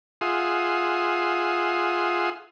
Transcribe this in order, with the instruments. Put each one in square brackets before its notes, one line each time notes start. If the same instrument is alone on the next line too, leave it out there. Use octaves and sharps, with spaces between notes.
[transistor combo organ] F4 G#4 E5 F#5 C6 D#6